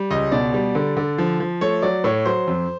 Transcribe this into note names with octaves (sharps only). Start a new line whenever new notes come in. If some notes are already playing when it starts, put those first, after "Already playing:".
Already playing: G3
C#2 D#5
B2 D5
G3
D3
D3
F3
F3
A3 C#5
F#3 D5
A2 C#5
F#3 C5
F2